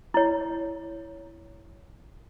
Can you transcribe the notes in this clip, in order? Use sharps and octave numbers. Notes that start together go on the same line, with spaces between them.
E4 C#5